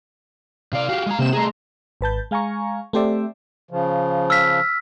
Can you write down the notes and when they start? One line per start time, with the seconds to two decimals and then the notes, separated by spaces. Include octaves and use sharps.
0.73 C3 D5 F5
0.89 F#4 G4
1.06 G#3 A#5
1.19 C3 A#3 C4 E7
1.33 A3 G#4 A#5 C6
2.01 G#1 B4 A5 G6
2.31 G#3 F5 G#5 A#5 C#6
2.93 A3 C4 G4 C5 D5 E5
3.70 C#3 F3
4.30 E6 F6 B6